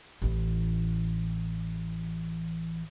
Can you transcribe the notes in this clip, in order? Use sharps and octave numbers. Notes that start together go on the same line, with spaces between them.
A1 E3